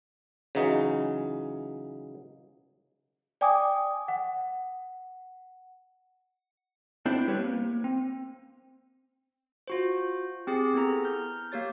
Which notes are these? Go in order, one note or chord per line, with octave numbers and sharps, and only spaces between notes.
C#3 E3 F#3 D#4
D5 G5 G#5 D6 D#6
F#5
B3 C4 D4 E4 C5 D5
G3 C4 G4 B4 C#5
A#3
C4
F4 F#4 C5
C4 G4 G#4
B3 E4 G#4 A4 A#5
F6 G6
A#3 G4 C#5 A6